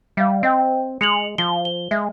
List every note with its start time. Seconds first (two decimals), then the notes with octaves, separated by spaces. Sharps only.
0.17 G3 E5 F5
0.43 C4 D#5 G5
1.01 G#3 C#7 F7 F#7
1.38 F3 G7
1.65 G7
1.91 G#3 E5